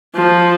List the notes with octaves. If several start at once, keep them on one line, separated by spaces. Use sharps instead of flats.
F3